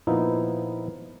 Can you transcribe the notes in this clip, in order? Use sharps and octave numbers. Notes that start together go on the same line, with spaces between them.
A#2 F3 B3 D#4 E4